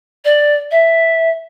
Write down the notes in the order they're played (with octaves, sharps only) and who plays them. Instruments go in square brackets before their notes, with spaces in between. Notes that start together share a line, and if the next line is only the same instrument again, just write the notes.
[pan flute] D5
E5